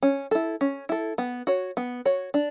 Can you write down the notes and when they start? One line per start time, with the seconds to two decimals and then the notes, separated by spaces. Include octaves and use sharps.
0.02 C#4
0.31 E4 A4
0.61 C#4
0.89 E4 A4
1.18 B3
1.47 F#4 C#5
1.77 B3
2.05 F#4 C#5
2.34 D4